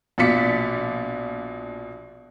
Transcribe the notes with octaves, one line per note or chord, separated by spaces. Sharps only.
A#1 B2 F4 D5 B6 C#7